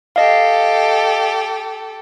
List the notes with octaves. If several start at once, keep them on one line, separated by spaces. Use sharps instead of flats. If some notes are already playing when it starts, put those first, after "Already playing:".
G4 A4 D#5 F5